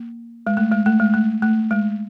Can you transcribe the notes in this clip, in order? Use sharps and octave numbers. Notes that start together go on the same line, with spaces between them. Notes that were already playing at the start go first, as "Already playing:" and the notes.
Already playing: A#3
G#3
A3
G#3
A3
G#3
A3
A3
G#3